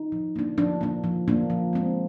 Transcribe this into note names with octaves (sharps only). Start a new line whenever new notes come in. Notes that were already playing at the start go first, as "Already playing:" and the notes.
Already playing: D#4
F3
A#3 D4
F3 D4
A#3 D4
F3
A#3 D4
F3
G#3 C4